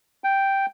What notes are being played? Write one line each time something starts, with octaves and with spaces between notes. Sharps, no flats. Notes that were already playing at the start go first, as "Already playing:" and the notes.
G5